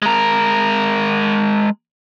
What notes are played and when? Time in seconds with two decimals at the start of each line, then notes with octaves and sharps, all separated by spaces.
0.02 G#3 A#4